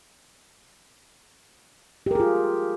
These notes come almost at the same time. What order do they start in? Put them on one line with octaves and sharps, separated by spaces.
G4 A#4 G#4 F4